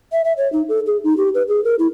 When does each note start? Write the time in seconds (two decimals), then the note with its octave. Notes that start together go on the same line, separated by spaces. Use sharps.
0.12 E5
0.24 E5
0.37 C#5
0.52 D#4
0.69 A4
0.86 G#4
1.04 D#4
1.17 G4
1.34 B4
1.48 G#4
1.64 A#4
1.79 E4